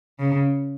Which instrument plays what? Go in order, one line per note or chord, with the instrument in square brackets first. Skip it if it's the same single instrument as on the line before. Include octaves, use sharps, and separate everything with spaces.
[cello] C#3